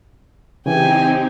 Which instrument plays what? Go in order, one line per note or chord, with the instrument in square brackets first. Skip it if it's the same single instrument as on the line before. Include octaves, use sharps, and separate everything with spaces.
[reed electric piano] C#3 E3 [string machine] C4 D#4 G4 [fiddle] G5 G#5